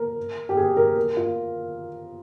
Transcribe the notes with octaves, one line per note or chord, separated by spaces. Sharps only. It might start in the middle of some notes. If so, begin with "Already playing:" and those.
Already playing: A#4
G4
G#4
A#4
A#4
F4